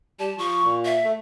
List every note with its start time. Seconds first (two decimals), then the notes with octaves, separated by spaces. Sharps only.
0.19 G3 A5
0.38 F3 C#6
0.64 A#2
0.85 E5
1.04 A3